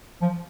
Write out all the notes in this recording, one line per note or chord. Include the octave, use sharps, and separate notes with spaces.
F3